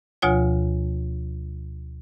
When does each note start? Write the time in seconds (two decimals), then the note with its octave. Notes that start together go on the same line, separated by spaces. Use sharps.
0.22 D2 B2 F3 F4 C#5 G#5